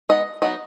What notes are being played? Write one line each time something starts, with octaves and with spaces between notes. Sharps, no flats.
G#3 B3 D#4 D#5
F#3 B3 D#4 D#5